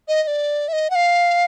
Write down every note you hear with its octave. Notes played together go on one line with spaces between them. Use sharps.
D#5
D#5
D5
E5
D#5
F#5
F5